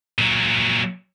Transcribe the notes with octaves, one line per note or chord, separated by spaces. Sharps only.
A#2 F#3